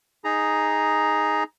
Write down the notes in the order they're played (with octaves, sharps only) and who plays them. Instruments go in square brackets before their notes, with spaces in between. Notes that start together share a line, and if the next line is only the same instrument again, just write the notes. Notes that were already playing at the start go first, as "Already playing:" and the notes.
[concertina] D#4 G#4 A#5